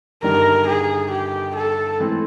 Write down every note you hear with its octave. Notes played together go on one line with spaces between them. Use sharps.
G1 G2 D#3 G3 A#4
G#4
G4
A4
G#2 E3 A3 C4